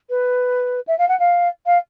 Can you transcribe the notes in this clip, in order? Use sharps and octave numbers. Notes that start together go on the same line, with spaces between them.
B4
E5
F5
F#5
F5
F5